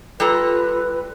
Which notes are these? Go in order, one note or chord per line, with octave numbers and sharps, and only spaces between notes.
G3 F4 A4 B4 A#5